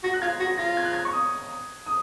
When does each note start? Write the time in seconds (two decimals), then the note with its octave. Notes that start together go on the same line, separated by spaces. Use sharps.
0.03 F#4 A#6
0.14 F#6
0.22 F4 G#6
0.40 F#4 A#6
0.58 F4 A#6
0.77 G#6
0.85 F#6
0.93 G#6
1.05 C#6
1.13 D#6
1.86 D#6